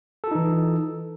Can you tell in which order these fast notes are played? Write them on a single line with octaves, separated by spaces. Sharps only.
A4 F4 D#4 E3